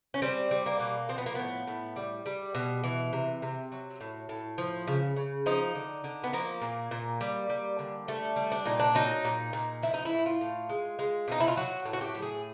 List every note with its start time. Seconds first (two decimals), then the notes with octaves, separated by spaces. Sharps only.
0.14 C#4
0.22 G3 C4
0.51 G3
0.66 A#3
0.80 B2
1.09 F3 C4
1.18 B3
1.26 A#3
1.35 A2 B3
1.67 A2
1.96 G3
2.26 G3
2.55 B2
2.84 E3
3.13 C3
3.42 C3
3.72 F#3
4.01 A2
4.29 A2
4.58 F3
4.87 C#3
5.16 C#3
5.46 F3 D#4
5.75 D3
6.04 D3
6.24 B3
6.33 F3 A#3
6.62 A#2
6.91 A#2
7.21 G3
7.50 G3
7.79 D3
8.08 G3 A3
8.36 G3
8.52 D4
8.65 A#2 D#4
8.80 D4
8.95 F#3 D#4
9.25 A#2
9.53 A#2
9.83 F3 E4
9.94 D#4
10.05 E4
10.12 A2
10.26 F4
10.41 A2
10.70 G#3
10.99 G#3
11.28 B2 D#4
11.40 E4
11.48 F4
11.57 F#3 F#4
11.85 A2
11.93 F#4
12.01 G4
12.15 A2
12.22 G#4